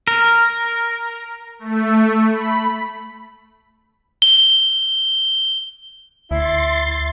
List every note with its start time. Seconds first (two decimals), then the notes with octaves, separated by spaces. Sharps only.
0.07 A#4
1.59 A3
2.31 B5
4.22 G7
6.31 D2 E4 C6 A6 C7